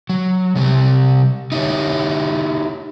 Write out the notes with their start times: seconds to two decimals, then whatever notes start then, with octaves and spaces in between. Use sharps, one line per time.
0.09 F#3
0.55 C3 G3 C4
1.52 D#4 E4 G4 C#5